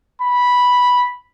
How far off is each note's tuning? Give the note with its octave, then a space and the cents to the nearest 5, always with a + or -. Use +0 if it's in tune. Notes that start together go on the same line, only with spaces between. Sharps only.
B5 -5